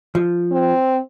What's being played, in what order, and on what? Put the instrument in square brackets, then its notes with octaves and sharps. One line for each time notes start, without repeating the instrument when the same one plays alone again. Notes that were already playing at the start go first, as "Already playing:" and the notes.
[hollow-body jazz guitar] F3
[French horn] C4